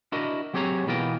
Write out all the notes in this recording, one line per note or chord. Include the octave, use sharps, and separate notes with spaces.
D4 E4 F#4 A#4 D#5
F#3 C4 G4 G#4 C#5 A#5
B2 E3 B3 F4 A#4 G5